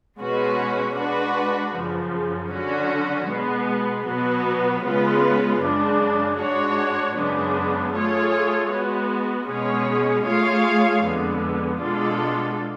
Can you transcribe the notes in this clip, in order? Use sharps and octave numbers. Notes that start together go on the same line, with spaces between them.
B2 G#3 C#4 F#4 B4
G#3 D4 F#4 B4
F#2 C#3 F3
D3 F#3 C#4 F#4
B2 G#3 B3
B2 F#3 B3 F#4 B4
C#3 G#3 B3 F4 B4
F#2 C#3 G#3 D4
G#2 G#3 D4 F#4 C#5
F#2 C#3 G#3 B3 D4
A3 F4 G#4 C#5
G#3 B3 F#4
B2 G#3 C#4 G#4 C#5
A3 F4 G#4 C#5 F5
F2 D3 G#3 B3
B2 G#3 D4 F4 A4